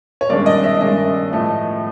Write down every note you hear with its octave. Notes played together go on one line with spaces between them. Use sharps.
C#5
G2 D#3 G#3 C#4 D5
D#5
E5
G2 D#3 G#3 C#4 D#5
A2 F3 A3